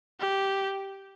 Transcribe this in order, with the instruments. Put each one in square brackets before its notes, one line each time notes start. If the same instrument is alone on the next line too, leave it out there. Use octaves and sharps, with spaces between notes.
[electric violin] G4